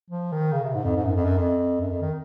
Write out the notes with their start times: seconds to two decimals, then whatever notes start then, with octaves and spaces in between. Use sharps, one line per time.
0.11 F3
0.32 D#3
0.53 C#3
0.63 C3
0.75 G#2
0.84 F2
0.96 G#2
1.05 F#2
1.15 F2
1.24 F#2
1.38 F2
1.80 F#2
1.91 F2
2.01 D#3